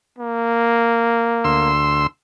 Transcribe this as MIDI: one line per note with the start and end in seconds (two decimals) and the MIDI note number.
0.18 1.70 58
1.44 2.07 38
1.44 2.07 84
1.44 2.07 88